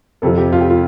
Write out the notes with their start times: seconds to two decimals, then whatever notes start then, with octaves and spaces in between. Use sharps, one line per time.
0.22 F2 C3 F3 A4
0.37 G4
0.52 F4
0.61 G4
0.70 F4